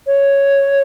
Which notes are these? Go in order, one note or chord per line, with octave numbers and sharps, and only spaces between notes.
C#5